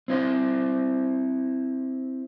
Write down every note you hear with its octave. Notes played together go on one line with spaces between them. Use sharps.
C4 E4 C5